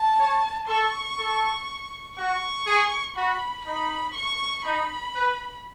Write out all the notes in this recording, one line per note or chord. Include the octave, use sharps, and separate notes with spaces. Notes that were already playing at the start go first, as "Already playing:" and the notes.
Already playing: A5
C#5
A4 C#6
A4
F#4 C#6
G#4
F#4 B5
D#4 B5
C#6
D#4 B5
B4